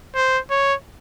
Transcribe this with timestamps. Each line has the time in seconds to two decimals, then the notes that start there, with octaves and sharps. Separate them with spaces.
0.15 C5
0.50 C#5